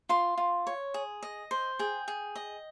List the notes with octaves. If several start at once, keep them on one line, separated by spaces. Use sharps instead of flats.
F4 C6
F4
C#5
G#4
D#5
C5
G#4 G5
G#4
D#5